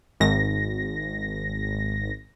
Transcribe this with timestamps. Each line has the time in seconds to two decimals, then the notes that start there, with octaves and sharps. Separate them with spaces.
0.20 G#1 A#6